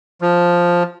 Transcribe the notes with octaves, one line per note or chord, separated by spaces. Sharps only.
F3